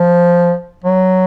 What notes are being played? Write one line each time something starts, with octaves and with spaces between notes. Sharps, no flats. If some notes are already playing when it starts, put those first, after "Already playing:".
Already playing: F3
F#3